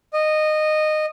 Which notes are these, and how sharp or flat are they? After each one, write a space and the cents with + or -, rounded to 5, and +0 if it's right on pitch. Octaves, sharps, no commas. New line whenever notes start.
D#5 -15